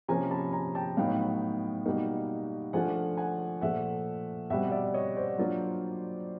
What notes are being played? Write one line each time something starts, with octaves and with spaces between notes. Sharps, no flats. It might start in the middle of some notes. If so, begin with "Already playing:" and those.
C3 F3 A#3 C#4 G#5 A#5
A5 B5
G#5 A#5
G5 A5
A2 F#3 B3 D#4 F5 G5
B2 G3 A#3 D#4
F3 A3 D4 F4 F#5 G#5
F#5 G#5
A#2 F3 A3 E5 F#5
B2 G3 C4 E5 F#5
D5 E5
C#5 D#5
C5 D5
F#3 A#3 D4 F4